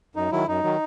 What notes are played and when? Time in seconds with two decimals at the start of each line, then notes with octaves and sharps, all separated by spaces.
0.15 F#2 D#4
0.31 D#3 F#3 E4
0.47 F#2 D#4
0.64 D#3 F#3